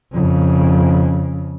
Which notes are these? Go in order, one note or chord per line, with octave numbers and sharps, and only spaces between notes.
F2 C#3